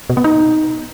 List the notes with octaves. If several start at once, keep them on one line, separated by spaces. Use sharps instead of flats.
B2
B3
D#4